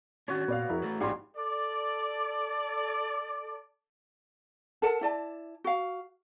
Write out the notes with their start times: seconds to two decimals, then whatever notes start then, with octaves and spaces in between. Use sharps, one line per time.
0.28 D#3 C#4 D4 F#4 C#5
0.48 A#2 B3 D5 F5
0.70 F2 E4 G#4 A#4
0.82 A3 A4 B4
1.00 A#1 G#2 G3 G#4 C#5 F5 C6
1.36 A4 D5
4.82 A4 A#4 F#5 A5
5.01 E4 D5 A5
5.64 F#4 F5